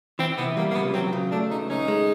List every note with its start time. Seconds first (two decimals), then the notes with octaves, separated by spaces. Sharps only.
0.19 E3 C4
0.37 C3 B3
0.57 G3 A#3
0.71 A#3
0.75 C#2 B3
0.94 F#3 C4
1.13 C#3
1.31 A3 D4
1.51 C#2 D#4
1.70 C#4 D#4
1.88 G#3